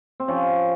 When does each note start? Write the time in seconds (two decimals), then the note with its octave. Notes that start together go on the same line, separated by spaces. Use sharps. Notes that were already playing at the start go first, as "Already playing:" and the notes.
0.20 C4
0.28 F3 C#4